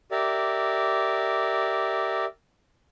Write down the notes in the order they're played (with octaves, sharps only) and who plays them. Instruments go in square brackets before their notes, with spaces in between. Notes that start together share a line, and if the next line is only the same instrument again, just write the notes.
[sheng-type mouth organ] G4 A#4 D5 E5